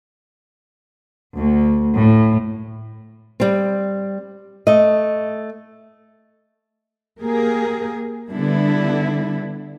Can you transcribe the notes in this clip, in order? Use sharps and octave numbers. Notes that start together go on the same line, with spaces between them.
D2
A2
G3 C4
A3 D#5
A#3 G4 G#4 A#4
D3 G3 B3 D4 E4